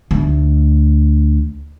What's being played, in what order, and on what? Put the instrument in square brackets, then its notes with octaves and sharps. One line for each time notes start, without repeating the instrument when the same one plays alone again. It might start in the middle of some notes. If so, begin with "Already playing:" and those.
[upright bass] D2 A3